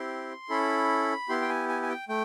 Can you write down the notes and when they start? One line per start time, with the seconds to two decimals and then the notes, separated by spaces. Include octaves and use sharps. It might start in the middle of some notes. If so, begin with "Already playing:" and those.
Already playing: C4 E4 G4 C6
0.49 C#4 E4 A4 B5
1.29 B3 E4 G4 C6
1.42 G5
1.49 G#5
1.69 G#5
1.82 G#5
1.89 G5
2.09 A3 G5